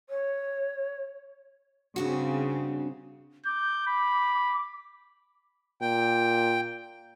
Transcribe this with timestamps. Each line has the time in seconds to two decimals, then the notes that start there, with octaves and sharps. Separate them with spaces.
0.10 C#5
1.96 G2 C#3 C4 D4 F#4
3.46 D6 G6
3.87 B5
5.82 A#2 G5